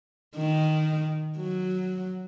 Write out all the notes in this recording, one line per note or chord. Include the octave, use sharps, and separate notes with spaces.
D#3
F#3